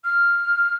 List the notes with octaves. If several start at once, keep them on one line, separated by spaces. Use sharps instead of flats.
F6